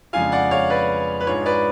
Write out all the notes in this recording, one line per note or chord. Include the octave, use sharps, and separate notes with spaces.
F2 C#3 G#3 D4 F4 F5 G#5
D5 F#5
C#5 F5
B4 D5
B4
G#2 G#3 D4 F4 C#5
B4 D5